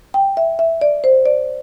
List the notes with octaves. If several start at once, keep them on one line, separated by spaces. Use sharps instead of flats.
G5
E5
E5
D5
C5
D5